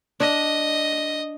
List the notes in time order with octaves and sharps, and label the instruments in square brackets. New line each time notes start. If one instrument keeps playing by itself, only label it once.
[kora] D4 [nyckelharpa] D#5